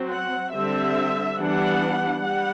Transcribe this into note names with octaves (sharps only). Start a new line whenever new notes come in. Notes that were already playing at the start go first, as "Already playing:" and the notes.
Already playing: F#3 C4
F#5
D3 G3 C4 E5
E3 G3 B3 D4 F#5
G3 F#5